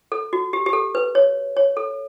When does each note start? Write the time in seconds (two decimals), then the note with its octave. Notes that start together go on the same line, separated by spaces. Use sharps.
0.12 A4
0.33 F#4
0.53 G4
0.66 G4
0.73 A4
0.95 B4
1.15 C#5
1.57 C#5
1.77 A4